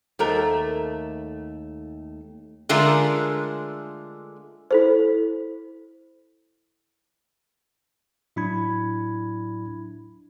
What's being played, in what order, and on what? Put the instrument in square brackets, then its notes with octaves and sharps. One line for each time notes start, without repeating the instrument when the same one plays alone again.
[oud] D#2 A3 A#4
[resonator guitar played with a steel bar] D3 G#3 A3 F4 A#4
[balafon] E4 A4 C5
[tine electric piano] A2 F#3 D4 E4 B5 G#6